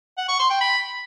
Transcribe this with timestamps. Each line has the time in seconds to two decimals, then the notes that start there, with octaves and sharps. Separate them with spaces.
0.18 F#5
0.28 C#6
0.39 C6
0.50 G5
0.61 B5